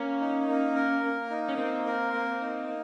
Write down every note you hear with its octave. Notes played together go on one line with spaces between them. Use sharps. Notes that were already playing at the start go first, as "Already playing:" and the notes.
Already playing: A#3 C#4
D#4
A#3
A#4
A#3
D#4
C#4
A#3 C4
A#4
A#3
D#4
A#3